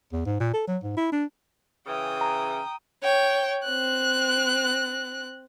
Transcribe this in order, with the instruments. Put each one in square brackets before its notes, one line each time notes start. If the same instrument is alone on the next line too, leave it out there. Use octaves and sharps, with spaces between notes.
[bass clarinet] E2
G#2
A#2
A4
F#3
G#2
E4
D4
[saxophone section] C#3 E3 [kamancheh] G5 D#6
[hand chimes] A#5
[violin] C#5 G5
C4 F#6